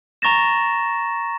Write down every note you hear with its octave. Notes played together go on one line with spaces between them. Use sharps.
A#5 C#6 A6 A#6 E7